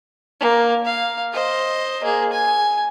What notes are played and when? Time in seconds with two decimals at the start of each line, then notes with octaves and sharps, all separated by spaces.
0.40 A#3
0.85 F5
1.33 C5 D#5
2.04 A#3 G#4
2.33 G#5